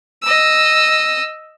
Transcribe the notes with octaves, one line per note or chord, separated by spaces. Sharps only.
D#5 E6